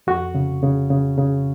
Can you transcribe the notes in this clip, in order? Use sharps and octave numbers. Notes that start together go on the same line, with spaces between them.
F2 F#4
C#3
C#3
C#3
C#3